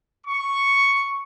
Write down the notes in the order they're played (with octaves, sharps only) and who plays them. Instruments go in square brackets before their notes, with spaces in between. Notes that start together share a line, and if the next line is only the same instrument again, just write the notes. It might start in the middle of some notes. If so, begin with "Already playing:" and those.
[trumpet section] C#6